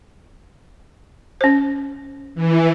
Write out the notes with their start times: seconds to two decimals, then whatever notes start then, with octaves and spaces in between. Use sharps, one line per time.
1.41 C#4 C5
2.35 E3